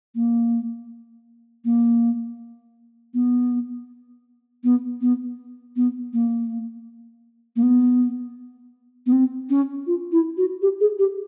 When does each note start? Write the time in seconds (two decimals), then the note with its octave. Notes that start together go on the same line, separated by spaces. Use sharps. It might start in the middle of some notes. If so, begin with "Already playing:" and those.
0.15 A#3
1.65 A#3
3.14 B3
4.64 B3
5.01 B3
5.76 B3
6.13 A#3
7.56 A#3
7.63 B3
9.06 B3
9.12 C4
9.50 C#4
9.87 F4
10.12 E4
10.37 F#4
10.62 G4
10.81 G#4
10.99 G4